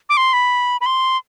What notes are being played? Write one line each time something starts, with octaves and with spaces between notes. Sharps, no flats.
D6
C6
B5
B5
C6